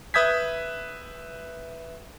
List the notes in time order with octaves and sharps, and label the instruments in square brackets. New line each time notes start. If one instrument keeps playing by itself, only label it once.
[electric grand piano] B4 E5 D#6 G6 G#6 B6